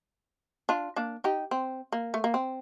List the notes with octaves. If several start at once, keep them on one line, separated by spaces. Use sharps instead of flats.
D4 F4
A#3 D4
D#4 G4
C4
A#3
A3
A#3
C4